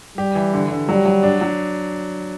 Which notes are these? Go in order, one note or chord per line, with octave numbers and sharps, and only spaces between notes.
G3 G4
E3
D3
D3
F#3 G3
F#3
D4
F#3